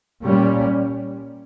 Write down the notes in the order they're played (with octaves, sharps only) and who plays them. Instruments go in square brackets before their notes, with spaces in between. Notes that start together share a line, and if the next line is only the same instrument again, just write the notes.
[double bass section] A#2 G3 C#4